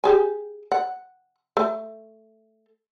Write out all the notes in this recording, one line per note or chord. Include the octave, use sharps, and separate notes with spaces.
G4 G#4 G#5
F#5
A3